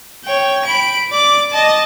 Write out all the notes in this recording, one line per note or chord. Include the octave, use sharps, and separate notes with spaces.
C#5 G5
B5 D7
D5 D6
D#5 A5